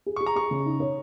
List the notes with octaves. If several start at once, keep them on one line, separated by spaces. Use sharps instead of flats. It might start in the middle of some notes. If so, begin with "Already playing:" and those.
G#4
C#6
G#4
A#5
G#4 C#6
C#3
D#4
C#5